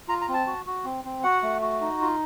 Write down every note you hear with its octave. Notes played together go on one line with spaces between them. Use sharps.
F4 A#5
A#5
C4
A5
F#4
F#4
C4
C4
F#4 F#5
A3
F#4
D#4
F4